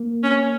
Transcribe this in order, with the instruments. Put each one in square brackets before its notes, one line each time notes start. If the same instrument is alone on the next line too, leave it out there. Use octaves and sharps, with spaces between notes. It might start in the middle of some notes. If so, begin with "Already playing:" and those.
Already playing: [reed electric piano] A#3
[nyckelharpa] C#4